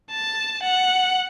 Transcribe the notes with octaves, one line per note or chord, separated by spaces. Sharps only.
A5
F#5